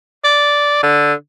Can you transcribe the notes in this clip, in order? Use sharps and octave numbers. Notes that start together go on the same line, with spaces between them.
D5
D3